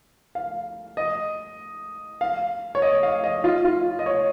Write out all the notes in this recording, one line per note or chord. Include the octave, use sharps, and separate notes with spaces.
F5
D#5
F5
C#5
D#5
F5
D#5
F4
F4
D#5
C#5